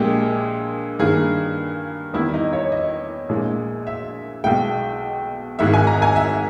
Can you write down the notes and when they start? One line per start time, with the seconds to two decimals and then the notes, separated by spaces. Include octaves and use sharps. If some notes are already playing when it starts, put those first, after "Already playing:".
Already playing: A#1 A#2 G#3 G4
0.99 G2 D#3 A#3 G#4
2.14 E2 D#3 G3 E4
2.34 D#4
2.53 C#5
2.72 D#5
3.29 A#1 A#2 G#3
3.87 E5
4.44 B1 B2 G#3 G5
5.59 G#1 G#2 D#3 G#3 E5
5.74 G#5
5.87 A#5
6.02 G#5
6.16 E5